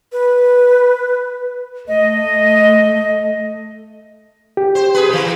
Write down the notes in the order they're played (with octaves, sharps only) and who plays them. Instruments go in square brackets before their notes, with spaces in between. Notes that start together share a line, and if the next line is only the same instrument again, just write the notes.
[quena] B4
[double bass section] A3 [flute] D#5
[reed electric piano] G4
[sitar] C5
G#4 B4
C3 E3